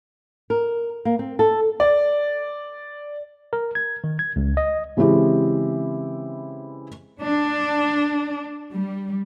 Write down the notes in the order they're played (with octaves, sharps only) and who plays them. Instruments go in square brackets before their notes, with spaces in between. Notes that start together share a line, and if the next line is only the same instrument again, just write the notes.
[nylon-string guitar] A#4
A#3
C4
A4
[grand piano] D5
[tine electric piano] A#4
G#6
D#3
G#6
C#2
D#5
[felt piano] C#3 E3 G#3 C4 E4 G4
[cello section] D4
G3